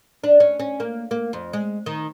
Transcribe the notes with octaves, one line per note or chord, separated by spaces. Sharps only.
D4
C#4
C#4
A#3
A#3
F2
G#3
D#3